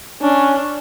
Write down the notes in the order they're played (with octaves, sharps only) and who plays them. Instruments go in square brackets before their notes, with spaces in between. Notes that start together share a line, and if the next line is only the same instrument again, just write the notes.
[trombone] C#4 [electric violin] D4